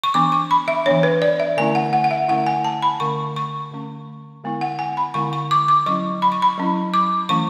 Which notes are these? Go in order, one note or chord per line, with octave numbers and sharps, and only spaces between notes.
C#6
E3 B3 D4 D6
C#6
B5
E5
E3 B3 D4 C#5
B4
D5
E5
D3 A3 C#4 E4 G#5
F#5
F#5
F#5
E5
D3 A3 C#4 E4 F#5
G#5
A5
B5
D3 A3 C#4 C#6
C#6
D3 A3 C#4
D3 G#3 B3 E4
F#5
G#5
B5
D3 G#3 B3 E4 C#6
C#6
D6
D6
F#3 C#4 E4 C#6
B5
C#6
B5
F#3 C#4 E4
D6
E3 A3 C#4 E4 C#6